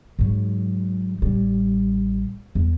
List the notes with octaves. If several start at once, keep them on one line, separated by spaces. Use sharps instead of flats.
G#2 F#3
A1 G3
E2